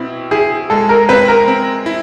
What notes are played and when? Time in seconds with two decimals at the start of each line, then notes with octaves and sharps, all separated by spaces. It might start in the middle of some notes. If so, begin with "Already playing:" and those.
Already playing: B2 C4 E4
0.31 E4 G#4
0.70 G#3 A4
0.89 A#4
1.09 C4 B4
1.28 A#4
1.48 C4
1.86 E4